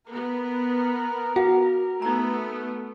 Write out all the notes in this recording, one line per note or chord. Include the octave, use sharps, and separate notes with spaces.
B3 A#4
F#4 F5 F#5
A3 B3 D#4 A#5